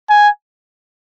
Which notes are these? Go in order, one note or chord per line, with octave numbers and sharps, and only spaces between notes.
G#5